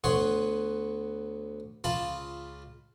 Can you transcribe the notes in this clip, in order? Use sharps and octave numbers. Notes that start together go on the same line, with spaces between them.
D2 B3 C#5 F#5 C6 C#6
C#2 F4 A5 B5